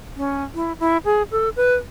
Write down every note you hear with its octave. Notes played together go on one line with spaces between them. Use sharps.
C#4
E4
E4
G#4
A4
B4